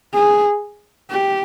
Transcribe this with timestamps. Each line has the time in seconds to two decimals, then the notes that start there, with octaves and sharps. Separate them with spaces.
0.13 G#4
1.10 G4